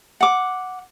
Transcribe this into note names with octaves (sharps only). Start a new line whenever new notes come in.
F#5 D6